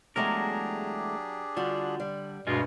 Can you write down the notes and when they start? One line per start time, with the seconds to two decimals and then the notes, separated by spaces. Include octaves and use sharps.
0.16 E2 F#3 G#3 A3 D4 G4 G#4 A#4
1.57 D3 G3 F4 F#4
2.00 G3
2.47 D2 G2 B2 G#3 F4